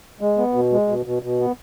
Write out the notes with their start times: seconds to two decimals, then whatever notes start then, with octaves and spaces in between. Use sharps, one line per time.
0.21 G#3
0.38 B3
0.54 B2
0.72 G#3
0.88 B2
1.06 B2
1.23 B2
1.40 B3